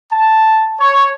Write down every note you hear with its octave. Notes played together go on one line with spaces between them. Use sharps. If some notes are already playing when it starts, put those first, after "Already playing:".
A5
C#5